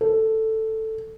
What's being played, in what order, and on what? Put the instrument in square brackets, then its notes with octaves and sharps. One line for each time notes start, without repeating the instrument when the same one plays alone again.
[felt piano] A4